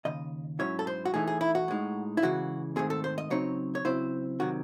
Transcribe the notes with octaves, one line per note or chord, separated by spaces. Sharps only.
D#2 C#3 D#5
G#2 F#3 C#4 E4 C#5
A4
C5
F#4
A2 E3 A3 D#4 G#4
G#4
E4
F#4
A2 G#3 D#4
E4
C#2 C#3 E3 G#3 F#4
G#2 D#3 A3 C4 G#4
A4
C5
D#5
C#3 F#3 C4 D#4 C#5
C#5
C#3 F#3 C4 E4 C5
C3 D#3 F#3 F#4